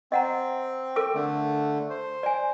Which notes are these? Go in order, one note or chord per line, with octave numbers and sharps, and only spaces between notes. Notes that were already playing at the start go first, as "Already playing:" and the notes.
C4 D#5 F#5 A#5
A4 A#4 D6
D3 A3
C5
D5 G#5